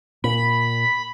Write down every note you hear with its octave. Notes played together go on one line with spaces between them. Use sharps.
A#2 B5